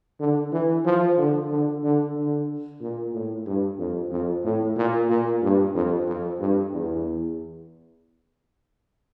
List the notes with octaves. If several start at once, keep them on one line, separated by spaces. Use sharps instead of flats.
D3
E3
F3
D3
D3
D3
D3
A#2
A2
G2
F2
F2
A2
A#2
A#2
G2
F2
F2
G2
E2